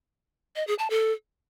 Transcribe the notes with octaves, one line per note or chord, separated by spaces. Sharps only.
D#5
G#4
A5
A4